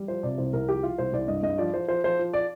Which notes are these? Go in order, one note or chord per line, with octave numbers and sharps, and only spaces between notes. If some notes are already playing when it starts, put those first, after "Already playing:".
Already playing: G3
F3 C5
C3 D5
C2 C5
C2 A#4
F3 G4
F3 F4
C2 C5
C2 D5
G2 D#5
G2 D#5
F3 D5
F3 C5
F3 C5
F3 C5
F3
D5